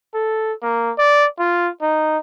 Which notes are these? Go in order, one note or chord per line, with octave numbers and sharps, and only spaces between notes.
A4
A#3
D5
F4
D#4